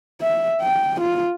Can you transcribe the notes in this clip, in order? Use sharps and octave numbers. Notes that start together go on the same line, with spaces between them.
E5
G5
F4